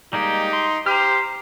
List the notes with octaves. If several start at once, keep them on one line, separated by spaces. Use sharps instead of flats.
G3 G#3 A#3 D#4 G4
C6
G4 C5 A#5 F6